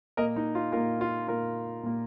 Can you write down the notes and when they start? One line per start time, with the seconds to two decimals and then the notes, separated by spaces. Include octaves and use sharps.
0.17 A#2 A#3 A#4 D#5
0.36 D#4
0.55 F4
0.72 A#2 A#3 F4 A#4
1.01 F4
1.28 A#2 A#3 F4 A#4
1.83 A#2 A#3